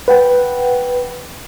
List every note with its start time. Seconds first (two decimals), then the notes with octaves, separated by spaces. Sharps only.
0.08 B4 F#5 G5